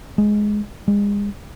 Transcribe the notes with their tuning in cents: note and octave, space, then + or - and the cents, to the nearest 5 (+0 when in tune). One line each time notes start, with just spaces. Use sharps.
G#3 +10
G#3 -35